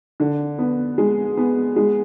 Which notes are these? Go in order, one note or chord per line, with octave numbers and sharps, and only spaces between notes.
D3
B3
G#3
B3
G#3